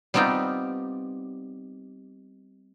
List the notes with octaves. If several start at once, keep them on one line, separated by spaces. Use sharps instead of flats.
G3 B3 C4 D#4 F4 G4